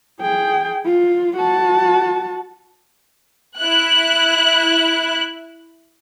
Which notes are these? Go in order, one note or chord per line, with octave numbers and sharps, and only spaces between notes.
G#4 G5
F4
F#4 A5
E4 F#6